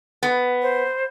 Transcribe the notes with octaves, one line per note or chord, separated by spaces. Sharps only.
B3
C5